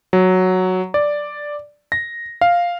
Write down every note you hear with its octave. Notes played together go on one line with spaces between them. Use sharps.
F#3
D5
A#6
F5